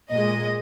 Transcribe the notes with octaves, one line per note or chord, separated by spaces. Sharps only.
A#2 G#3 D#5